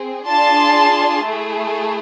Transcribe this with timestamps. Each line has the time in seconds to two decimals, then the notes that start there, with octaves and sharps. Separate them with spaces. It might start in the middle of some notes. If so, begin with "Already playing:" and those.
Already playing: C4 G#4
0.27 D4 F4 G#4 A5 C6
1.26 A3 E4 G#4